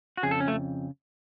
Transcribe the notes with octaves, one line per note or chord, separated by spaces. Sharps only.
F#4
F2 C#3 G#4
A4
C#4
A3